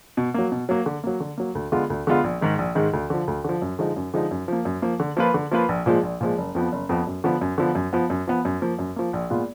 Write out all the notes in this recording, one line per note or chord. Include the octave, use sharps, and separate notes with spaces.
B2
F#3 A#3
B2
F#3 A#3
D3
F#3 A#3
D3
F#3 A#3
D2
D3 G#3 B3 F4
D2
D3 G#3 B3 F4
A#1
G#2 D#3 G#3
A#1
G#2 D#3 G#3
D2
D3 F3
D2
D3 F3
F#2
D3 F3 G#3 D#4
F#2
D3 F3 G#3 D#4
F#2
F3 A#3
F#2
F3 A#3
D3
F3 A#3 F4 B4
D3
F3 A#3 F4 B4
A#1
A#2 F3 G#3
A#1
A#2 F3 G#3
F#1
F2 F3 B3
F#1
F2 F3 B3
F#2
D3 F3 B3
F#2
D3 F3 B3
F#2
F3 B3
F#2
F3 B3
F#2
F3 A#3
F#2
F3 A#3
A#1
A#2 G#3 B3 F4